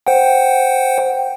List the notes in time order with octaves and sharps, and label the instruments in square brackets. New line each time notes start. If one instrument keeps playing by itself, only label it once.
[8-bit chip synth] C5 F#5 G5